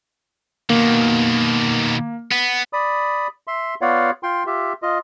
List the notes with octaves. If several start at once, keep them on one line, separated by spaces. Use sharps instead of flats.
B2 D#3 A#3
B3
D5 B5 D#6
E5 C6
B3 F4 C#5 D5 F5 F#5
F4 G5 C6
F4 G4 E5
F4 D#5